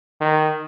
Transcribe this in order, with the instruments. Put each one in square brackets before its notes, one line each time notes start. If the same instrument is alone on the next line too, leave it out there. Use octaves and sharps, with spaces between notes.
[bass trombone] D#3